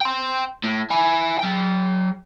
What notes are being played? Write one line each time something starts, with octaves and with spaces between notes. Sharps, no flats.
G5 C6
A2
E4 G#5
F#3 G5